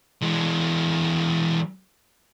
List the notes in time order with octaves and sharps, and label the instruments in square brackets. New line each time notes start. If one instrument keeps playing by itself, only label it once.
[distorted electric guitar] E3 G#3